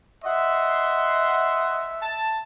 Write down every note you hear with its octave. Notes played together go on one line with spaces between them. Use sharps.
D#5 E5 F#5 C6
A5